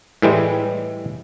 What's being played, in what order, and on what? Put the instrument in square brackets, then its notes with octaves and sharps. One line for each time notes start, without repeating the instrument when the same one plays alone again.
[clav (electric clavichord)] A2 E3 G3 G#3